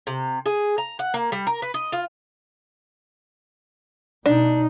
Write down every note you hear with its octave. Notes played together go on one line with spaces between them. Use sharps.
C3
G#4
A#5
F#5
A#3
G3
A#4
B4
D#5
F4
B2 D4 D#4